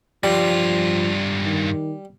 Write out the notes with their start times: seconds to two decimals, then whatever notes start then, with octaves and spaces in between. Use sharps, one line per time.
0.24 G2 F3 G3 F4
1.45 D#3